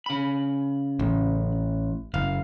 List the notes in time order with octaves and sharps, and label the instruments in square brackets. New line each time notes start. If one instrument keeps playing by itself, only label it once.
[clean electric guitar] C#3 B5
[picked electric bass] A1
[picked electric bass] F#1 [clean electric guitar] F5